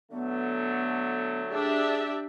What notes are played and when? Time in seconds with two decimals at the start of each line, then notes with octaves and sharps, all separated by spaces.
0.12 D3 F#3 A3 B3
1.52 D4 G4 G#4 E5